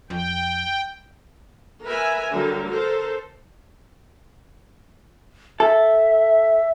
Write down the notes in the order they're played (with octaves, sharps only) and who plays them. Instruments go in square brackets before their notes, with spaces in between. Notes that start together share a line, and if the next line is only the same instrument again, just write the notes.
[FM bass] F2 [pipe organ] G5
[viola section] A#4 B4 E5 G#5
D3 F#3 G3 A#4
A4 A#4 C5
[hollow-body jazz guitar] A4 [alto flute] E5